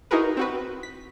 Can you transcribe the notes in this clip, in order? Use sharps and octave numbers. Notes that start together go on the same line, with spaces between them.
D#4 E4 F#4 G#4 A#4 B4
C4 F#4 B4
B6